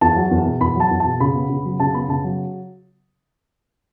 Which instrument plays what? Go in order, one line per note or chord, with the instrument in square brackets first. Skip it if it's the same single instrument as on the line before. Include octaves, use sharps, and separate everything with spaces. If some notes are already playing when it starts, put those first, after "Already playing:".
[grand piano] E2 A5
F#3
E2
B2
E2 B5
F#3 A5
E2
B2 A5
C#3 B5
B3
C#3
F#3
C#3 A5
B3 B5
C#3 A5
F#3